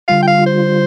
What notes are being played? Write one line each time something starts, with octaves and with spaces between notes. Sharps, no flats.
D3 G3 F4 F5
G5
F5
C5